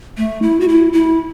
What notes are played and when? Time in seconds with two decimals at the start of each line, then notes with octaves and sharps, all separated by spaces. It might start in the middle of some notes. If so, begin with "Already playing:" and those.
0.17 A3
0.42 E4
0.60 F#4
0.68 E4
0.93 E4